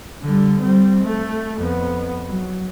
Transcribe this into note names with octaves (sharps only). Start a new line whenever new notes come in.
D3 G3
G3 C4
A3
F2 B3
F#3